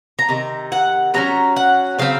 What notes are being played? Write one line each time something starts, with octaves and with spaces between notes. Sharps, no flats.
A#5
C3 D#3
F#5
C3 F#3 C#4 A#5
F#5
C#3 F#3 C4 F5